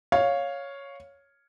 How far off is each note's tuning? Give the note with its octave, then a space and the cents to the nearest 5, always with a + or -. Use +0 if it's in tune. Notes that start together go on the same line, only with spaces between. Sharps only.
C#5 +0 F5 +5